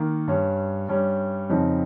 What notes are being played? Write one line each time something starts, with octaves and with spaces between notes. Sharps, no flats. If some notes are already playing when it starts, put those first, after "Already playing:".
Already playing: D#3 A#3 D#4
G2 G3 C#4
G2 G3 C#4
F2 C#3 F3 C4 D#4